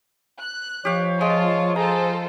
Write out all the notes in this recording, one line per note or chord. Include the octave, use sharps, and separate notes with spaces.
F#6
F3 G4 C#5 F5
G#3 F4 A5
F4 G#4 A4 C5 A#5